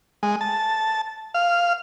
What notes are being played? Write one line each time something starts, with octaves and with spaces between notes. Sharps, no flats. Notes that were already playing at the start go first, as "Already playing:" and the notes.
G#3
A5
F5